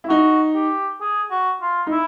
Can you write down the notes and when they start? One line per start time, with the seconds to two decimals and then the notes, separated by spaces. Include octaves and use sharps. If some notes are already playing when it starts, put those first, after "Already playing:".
0.04 E4
0.09 D#4 F#4
0.55 G4
1.01 G#4
1.31 F#4
1.62 F4
1.87 D#4
1.92 E4